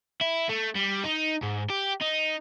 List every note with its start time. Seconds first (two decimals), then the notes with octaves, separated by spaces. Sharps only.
0.21 E4
0.49 A3
0.76 G3
1.04 D#4
1.43 G#2
1.70 G4
2.01 D#4